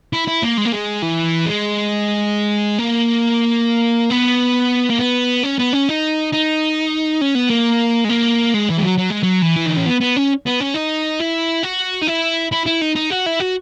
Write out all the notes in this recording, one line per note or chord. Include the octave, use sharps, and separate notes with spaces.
E4
E4
A#3
G#3
A#3
G#3
E3
G#3
A#3
B3
A#3
B3
C#4
B3
C#4
D#4
D#4
C#4
B3
A#3
G#3
A#3
G#3
E3
G#3
F#3
F#3
G#3
F#3
E3
E4
D#4
C#4
B3
B3
C#4
B3
C#4
D#4
E4
F#4
D#4
E4
E4
E4
D#4
D#4
F#4
E4
F#4